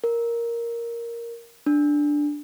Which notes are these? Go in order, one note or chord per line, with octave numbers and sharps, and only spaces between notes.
A#4
D4